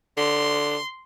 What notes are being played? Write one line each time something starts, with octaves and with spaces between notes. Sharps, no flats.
D3 C6